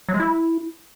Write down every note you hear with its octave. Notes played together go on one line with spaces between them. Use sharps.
F#3
G#3
E4